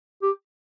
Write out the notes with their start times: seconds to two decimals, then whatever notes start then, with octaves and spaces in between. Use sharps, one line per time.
0.22 G4